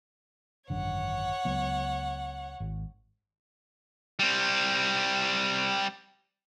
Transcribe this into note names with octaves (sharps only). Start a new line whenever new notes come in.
G#1 F#2 D3 C#5 F#5
C#2 F#3 B3
G#1
G3 C4